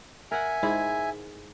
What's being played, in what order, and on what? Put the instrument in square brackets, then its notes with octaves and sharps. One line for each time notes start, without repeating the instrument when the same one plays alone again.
[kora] A#4 F#5 [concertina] E5 G#5
[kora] G#2 E4 G#4